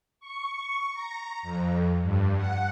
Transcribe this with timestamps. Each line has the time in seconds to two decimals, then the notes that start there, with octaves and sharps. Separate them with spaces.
0.20 C#6
0.94 A#5
1.43 F2
2.02 G2
2.37 F#5